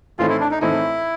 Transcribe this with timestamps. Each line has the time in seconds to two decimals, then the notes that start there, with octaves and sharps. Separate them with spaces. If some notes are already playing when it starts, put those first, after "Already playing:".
0.18 A2 E3 A3 C4 D#4 F4
0.29 E4
0.40 D4
0.51 D#4
0.61 A2 E3 A3 C4 D#4 E4